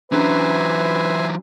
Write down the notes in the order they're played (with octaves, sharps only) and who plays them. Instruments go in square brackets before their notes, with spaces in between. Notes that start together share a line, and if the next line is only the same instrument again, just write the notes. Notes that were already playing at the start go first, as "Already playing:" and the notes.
[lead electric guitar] E3 F#3 [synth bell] C#4 D4 [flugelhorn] B4 [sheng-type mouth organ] C5 E5 G#5